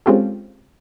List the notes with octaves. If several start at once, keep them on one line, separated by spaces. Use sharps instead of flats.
G#3 C4 C#4 F4 G4 A4